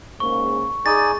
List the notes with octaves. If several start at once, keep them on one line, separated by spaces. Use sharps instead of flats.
G#2 C#3 A#3 C#6
D#4 G#4 D5 G#5 A6